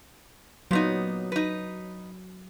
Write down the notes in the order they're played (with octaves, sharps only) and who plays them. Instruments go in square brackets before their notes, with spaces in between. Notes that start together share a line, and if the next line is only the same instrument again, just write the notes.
[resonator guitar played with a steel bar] A#2 B3 D#4 [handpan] F#3
[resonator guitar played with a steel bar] D#4 B4